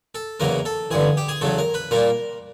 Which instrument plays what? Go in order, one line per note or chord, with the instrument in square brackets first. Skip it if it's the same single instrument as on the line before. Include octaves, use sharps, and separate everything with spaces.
[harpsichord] A4
E2 C#3 F#3 A#3 A#4
A4
A1 G2 D3 G#4
G4
G#4
E2 C#3 F#3 A4
A#4
B4
A#2 G3 A#3 A#4